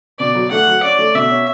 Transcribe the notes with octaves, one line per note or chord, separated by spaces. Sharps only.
B2 D5
F#3
A3 F#5
F#3
C#4 D5
A3
B2 E5
C#4